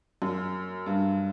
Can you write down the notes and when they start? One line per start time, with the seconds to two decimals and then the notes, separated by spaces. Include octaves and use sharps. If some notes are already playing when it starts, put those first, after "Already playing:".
0.22 F#2
0.86 G2